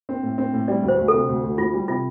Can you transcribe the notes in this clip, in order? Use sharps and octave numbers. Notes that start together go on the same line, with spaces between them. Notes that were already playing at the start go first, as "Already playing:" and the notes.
C4
A2
C4
A2
G3 D5
D2
C5
D2
A4
C3
D2
D2
D2 F4
G3
C3 F4